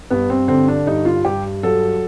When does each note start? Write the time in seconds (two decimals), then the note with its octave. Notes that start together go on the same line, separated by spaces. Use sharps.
0.11 G2 B3
0.30 C4
0.48 D3 C4
0.68 D4
0.86 G2 D#4
1.05 F4
1.25 G2 G4
1.63 F#3 A4